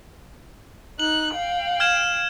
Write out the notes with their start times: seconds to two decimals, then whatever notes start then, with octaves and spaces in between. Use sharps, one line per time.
0.99 D#4 F#6 F#7
1.35 F5 G5
1.80 F6 G#6 E7